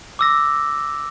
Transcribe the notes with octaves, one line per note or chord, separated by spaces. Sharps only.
D6 E6 A#6